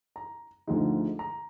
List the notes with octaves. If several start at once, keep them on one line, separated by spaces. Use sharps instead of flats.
A#5
D2 D3 F3 G#3 D#4
A#5